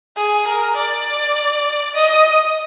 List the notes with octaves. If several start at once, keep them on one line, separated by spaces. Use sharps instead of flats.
G#4
A#4
D5
D#5